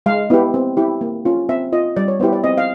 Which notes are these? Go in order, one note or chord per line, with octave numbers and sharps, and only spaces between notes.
G#3 F5
B3 E4 G4
C4
E4 G4
A#3
C#4 F4
C4 E5
F4 D#5
G3 D5
C#5
B3 E4 G4 C5
D5
C4 D#5
F5